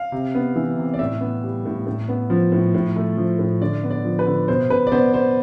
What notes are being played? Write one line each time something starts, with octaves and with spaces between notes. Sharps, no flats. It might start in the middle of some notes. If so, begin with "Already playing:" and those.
Already playing: F5
C3
B3
E3
C3
D5
A2 E5
B3
G3
A2
A2
B3
F3
A2
A2
A3
F3
A2
D3 D5
B3
D5
F3
B4
D3
B2 C5
B2 B4
D5
B3 C5
B3 C5